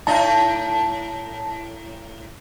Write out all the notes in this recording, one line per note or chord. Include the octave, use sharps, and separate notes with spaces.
A2 D#4 A5